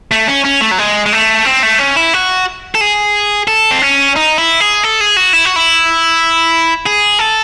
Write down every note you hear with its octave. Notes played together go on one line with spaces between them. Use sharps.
A3
C#4
C#4
A3
F#3
G#3
G#3
A3
C4
A3
C#4
E4
F#4
A4
G#4
A4
C4
C#4
D#4
E4
G#4
A4
G#4
F#4
E4
F#4
E4
G#4
A4